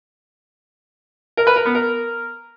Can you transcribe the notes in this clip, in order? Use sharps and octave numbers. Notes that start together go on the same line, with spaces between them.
A#4
B4
A#4
B3
A#4